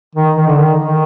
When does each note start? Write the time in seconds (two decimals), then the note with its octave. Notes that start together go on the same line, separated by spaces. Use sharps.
0.16 D#3
0.37 D#3
0.47 D3
0.58 D#3
0.79 D#3